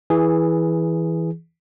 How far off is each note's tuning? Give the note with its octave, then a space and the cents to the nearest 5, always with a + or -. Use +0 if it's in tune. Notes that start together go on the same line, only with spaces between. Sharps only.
E3 -5 G#4 +0